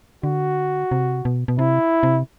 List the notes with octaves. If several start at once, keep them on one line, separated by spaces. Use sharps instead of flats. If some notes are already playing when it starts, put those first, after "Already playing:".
D3 F#4
C3
B2
B2
C3 E4
C3